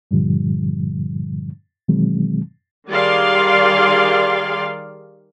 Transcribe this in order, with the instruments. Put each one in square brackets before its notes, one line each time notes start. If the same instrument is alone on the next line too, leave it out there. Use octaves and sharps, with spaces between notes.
[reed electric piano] G2 A#2 D3 F3 G3
B2 D#3 E3 F#3 G#3 C4
[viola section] D#3 G3 G#4 D5 F5 C6